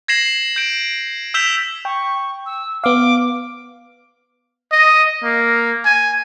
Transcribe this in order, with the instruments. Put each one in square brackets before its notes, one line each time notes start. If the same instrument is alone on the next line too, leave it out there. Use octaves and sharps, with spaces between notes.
[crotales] G#6 A#6 C7 E7 F#7
G6 D7
E6 G6 B6 E7 F7 G7
[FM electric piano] G5 [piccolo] C#6
[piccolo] E6
[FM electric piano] B3 F5 [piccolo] D6
[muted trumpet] D#5
A#3
G#5